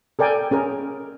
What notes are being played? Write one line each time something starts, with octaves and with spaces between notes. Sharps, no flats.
A4 A#4 D5 G5 G#5
C#4 G#4 A#4